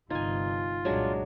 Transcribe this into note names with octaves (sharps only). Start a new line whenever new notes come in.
G1 C3 D#4 F4 G#5
C2 A#2 F#3 G#3 D4